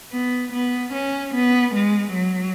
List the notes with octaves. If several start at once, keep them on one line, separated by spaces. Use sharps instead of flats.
B3
B3
C#4
B3
G#3
F#3